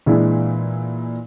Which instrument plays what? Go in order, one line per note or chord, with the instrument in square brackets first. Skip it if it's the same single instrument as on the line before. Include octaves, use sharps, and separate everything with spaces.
[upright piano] A#2 E3 G#3 D4 E4